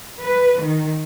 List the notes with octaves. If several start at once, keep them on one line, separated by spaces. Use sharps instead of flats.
B4
D#3